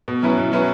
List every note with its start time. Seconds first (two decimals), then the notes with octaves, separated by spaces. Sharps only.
0.08 B2
0.23 F#3 C#4 E4 B4
0.38 B2
0.52 F#3 C#4 E4 B4